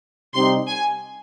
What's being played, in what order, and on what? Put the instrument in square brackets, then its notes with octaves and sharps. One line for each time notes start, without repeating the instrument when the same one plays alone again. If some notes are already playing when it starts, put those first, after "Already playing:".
[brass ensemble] C3 G3 C4 D#4 G4 [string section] C6
[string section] G#5